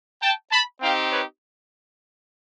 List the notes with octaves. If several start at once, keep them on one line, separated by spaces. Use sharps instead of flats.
G5 A5
A5 B5
C4 D#4 G4 F5 G5
B4 C#5